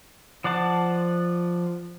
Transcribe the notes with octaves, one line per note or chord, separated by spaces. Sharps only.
F3 D5 F#5 A5